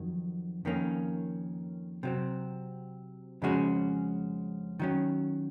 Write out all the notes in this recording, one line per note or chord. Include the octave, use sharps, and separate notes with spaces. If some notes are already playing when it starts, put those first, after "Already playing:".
Already playing: F2 D#3 F#3
F2 D#3 A#3 C#4
C3 F#3 C4
F2 C#3 G#3 C#4 F#4
D#3 F#3 C#4